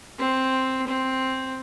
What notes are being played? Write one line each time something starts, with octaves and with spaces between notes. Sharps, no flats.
C4
C4